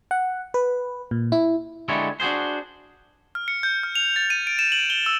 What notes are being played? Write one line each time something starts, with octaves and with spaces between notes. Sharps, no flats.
F#5
B4
A#2
E4
D3 G#3 E4 G4 A4 C#5
D4 F#4 G#4 C5
F6
C#7
G6
F6
F7
A6
D#7
D7
E7
F#7
G7
E6